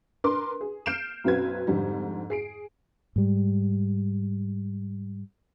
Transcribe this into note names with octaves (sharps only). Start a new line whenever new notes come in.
D4 A#4 B4 C6 D6
G#4
F6 G6 C7 D7 E7
B1 F#2 C4 F#4 B4 G#6
F2 G#2 D3 G3
G#4 C7 D7
G#2 G3